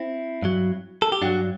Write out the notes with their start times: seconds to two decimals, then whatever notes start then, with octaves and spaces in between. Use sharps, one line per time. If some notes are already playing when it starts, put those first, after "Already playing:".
Already playing: C4 E4
0.42 G2 F#3
1.02 A4
1.12 G4
1.22 G2 F#3 D4 F#4